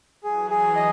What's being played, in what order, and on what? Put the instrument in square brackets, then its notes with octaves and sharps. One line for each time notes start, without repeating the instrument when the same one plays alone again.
[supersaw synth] E3 F#3 [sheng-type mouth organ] G#4
[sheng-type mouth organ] G#4
D#5